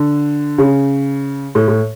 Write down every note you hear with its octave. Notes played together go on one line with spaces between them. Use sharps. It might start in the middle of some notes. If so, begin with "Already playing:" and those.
Already playing: D3
C#3
A2
A2